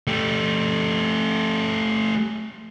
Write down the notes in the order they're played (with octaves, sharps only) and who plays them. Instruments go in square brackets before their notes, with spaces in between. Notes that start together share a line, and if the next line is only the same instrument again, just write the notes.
[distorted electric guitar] A3 G4